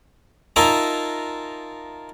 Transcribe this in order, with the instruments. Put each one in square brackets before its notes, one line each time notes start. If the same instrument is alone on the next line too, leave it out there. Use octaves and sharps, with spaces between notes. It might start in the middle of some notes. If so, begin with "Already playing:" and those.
[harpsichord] D#4 F4 A#4 E5 G#5 A5